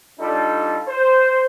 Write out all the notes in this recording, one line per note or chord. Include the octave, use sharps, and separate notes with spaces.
G3 D4 D#4 F4 A4
C5